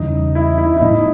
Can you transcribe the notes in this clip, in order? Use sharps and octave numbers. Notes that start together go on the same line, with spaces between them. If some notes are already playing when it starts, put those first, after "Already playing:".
Already playing: E2 C#3 E3 G3 D#4
E4
E4
E4
A2 F#3 B3 D4 D#4